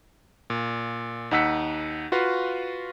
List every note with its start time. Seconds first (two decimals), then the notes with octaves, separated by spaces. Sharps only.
0.50 A#2
1.31 D#2 D#4 F#5 E6 B6 C#7
2.12 F4 F#4 B4 F5